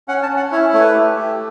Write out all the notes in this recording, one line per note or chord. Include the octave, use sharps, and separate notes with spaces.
C#4 F#5
A5
C#4
F#5
E4 C#5
A3 C#5
B4
G4
A3